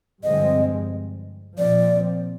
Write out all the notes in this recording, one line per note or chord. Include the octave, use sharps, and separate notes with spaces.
G2 D3 F3 G#3 C4 D#5
A#2 F3 C4 D5